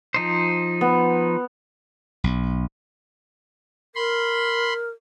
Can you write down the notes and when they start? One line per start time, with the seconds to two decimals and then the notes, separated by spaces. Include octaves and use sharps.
0.14 F3 D#4 C5
0.81 B3
2.24 B1
3.95 A#4 B5 C6